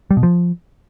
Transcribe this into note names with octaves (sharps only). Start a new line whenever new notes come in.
G3
B2
F3